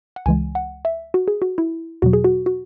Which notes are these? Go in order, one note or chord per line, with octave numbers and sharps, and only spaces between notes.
F#5
C#2 C#3 E3 G#3 G#5
F#5
E5
F#4
G#4
F#4
E4
E2 B2 F#3 F#4
G#4
F#4
F#4